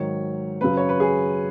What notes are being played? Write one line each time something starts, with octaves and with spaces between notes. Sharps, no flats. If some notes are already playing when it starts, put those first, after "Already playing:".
Already playing: G#2 D#3 F#3 C#5
F#2 C#3 F#3 B4
C#5
B4
G#4